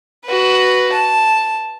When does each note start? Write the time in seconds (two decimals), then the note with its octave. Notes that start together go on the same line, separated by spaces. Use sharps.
0.25 F#4 B4
0.92 A5